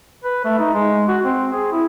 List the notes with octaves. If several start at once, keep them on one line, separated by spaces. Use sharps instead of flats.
B4
A3
D#4
G#3
F#4
C4
G#4
E4